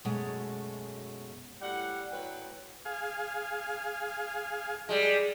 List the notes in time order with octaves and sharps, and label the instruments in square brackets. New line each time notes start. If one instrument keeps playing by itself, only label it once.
[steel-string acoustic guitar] F#2 B2 G#3 A3 C#5
[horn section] A2 G3 F#5
A2 F#3 B4 G5
[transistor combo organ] G#4 F5
[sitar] G3 G#3